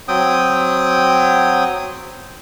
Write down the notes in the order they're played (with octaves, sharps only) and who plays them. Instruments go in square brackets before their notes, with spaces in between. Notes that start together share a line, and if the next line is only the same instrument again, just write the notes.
[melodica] F#3 C4 G5 D#6